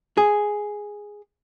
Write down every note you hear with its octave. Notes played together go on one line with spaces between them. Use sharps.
G#4